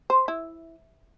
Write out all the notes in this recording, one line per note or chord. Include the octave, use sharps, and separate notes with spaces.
C5
E4